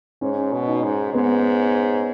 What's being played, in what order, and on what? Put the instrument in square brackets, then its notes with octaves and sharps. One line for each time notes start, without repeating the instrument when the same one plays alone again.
[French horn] G#2 [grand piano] C#4
[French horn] B2
[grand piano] D#4
[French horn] G#2
[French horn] G#2 [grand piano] B3